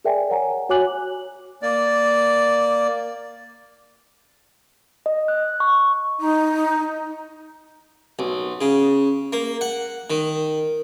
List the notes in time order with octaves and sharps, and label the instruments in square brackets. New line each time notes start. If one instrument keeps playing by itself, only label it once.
[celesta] G#4 A#4 D5 E5 G5 G#5
C#5 F#5 G#5 A#5
F#4 C#5 G#5 D6 F#6 F#7
[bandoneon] A#3 D5
[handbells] D#5
F#6
C#6
[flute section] D#4
[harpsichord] B1
C#3
A#3
F#5
D#3